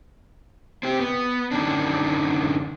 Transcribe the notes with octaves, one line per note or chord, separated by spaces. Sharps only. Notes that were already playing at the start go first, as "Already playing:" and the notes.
C4 G4
B3
F#2 D3 D#3 C#4 D4